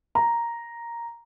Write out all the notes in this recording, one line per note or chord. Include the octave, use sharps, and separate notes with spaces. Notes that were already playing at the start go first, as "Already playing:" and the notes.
A#5